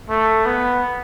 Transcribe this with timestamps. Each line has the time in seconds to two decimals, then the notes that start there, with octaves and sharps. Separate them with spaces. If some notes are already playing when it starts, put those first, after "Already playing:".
0.09 A3
0.46 B3